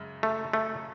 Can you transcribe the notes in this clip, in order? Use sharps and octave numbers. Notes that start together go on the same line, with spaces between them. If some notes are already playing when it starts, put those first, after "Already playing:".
Already playing: F#2 C#3 G#3
A3
A3